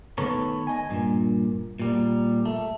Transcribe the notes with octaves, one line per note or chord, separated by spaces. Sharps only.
D#3 A3 B3 A4 B4 C#5
D#5 G#5
G2 A#2
A#2 G3
A3